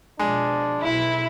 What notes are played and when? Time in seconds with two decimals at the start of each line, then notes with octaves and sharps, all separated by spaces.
0.19 B2 F3 G#3 D4
0.82 B1 E4